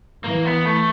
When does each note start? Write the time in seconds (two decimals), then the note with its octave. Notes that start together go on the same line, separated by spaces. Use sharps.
0.24 E3 A#3
0.45 B3
0.65 A3